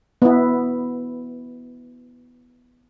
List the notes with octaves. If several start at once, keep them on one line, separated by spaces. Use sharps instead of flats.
B3 E4